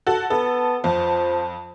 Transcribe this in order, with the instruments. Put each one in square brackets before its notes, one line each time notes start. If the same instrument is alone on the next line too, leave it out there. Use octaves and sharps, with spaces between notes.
[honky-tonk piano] F#4 A4
[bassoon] B3 [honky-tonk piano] A4
[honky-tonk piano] F2 [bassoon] F3